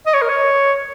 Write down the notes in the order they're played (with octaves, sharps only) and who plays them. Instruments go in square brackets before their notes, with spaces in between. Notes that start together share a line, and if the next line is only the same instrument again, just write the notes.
[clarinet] D#5
C#5
A#4
C#5